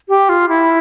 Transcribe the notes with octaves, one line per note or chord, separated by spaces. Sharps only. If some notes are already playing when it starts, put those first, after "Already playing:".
G4
F4
E4